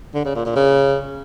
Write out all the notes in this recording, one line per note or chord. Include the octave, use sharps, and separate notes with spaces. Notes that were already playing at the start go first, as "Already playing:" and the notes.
D3
C#3
A#2
A#2
C#3